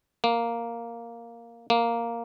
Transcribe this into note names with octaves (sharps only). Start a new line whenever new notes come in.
A#3
A#3